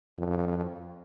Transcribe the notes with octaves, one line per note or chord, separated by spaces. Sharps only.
F2